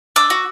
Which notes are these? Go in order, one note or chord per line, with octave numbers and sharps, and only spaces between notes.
D4 D6 E6
F#4